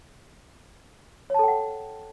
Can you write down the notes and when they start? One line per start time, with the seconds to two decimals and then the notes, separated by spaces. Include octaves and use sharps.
1.30 C#5
1.34 A5
1.39 A4
1.44 G5
1.48 F#5